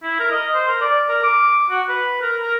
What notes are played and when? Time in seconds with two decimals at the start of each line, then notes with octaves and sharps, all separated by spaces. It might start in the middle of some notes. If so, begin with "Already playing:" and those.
0.03 E4
0.19 A#4
0.32 D#5
0.55 C5
0.68 A#4
0.81 D5
1.09 A#4
1.24 D6
1.70 F#4
1.89 B4
2.22 A#4
2.42 A#4